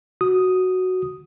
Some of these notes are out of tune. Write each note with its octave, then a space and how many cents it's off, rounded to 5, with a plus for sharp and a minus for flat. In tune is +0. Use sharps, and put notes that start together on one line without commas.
F#4 +0 D#6 +0